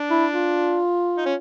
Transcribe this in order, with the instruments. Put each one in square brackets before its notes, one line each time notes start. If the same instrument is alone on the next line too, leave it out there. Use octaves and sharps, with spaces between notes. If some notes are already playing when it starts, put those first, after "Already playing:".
Already playing: [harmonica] D4
[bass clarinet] E4
F4
[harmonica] D#4
C#4